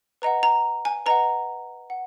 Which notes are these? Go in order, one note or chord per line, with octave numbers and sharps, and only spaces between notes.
B4 D#5 F#5 A#5
A#5
G#5
B4 D#5 F#5 A#5
F#5